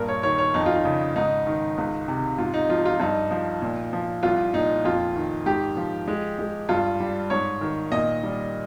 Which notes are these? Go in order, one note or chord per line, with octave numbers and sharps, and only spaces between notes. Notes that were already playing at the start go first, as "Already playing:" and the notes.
Already playing: G2 A#2 A#4
C#5
D#3 C#5
C#5
F2 D#4
F4
D#4
C#3
G#2 D#4
D#3
C#2
C3
G#2 F4
D#4
F3 F4
F4
G2 D#4
F3
A#2
F3
C2 F4
A#2 D#4
F2 F4
D#3
G#2 G4
F3
G#3
G#3
G2 F4
G3
G#2 C#5
D#3
A#2 D#5
G3